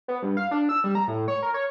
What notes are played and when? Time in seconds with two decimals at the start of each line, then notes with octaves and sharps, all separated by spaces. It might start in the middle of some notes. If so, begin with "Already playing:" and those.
0.08 B3
0.22 G2
0.37 F5
0.51 D4
0.69 E6
0.84 G3
0.95 A#5
1.08 A2
1.28 C#5
1.43 A#4
1.54 C#5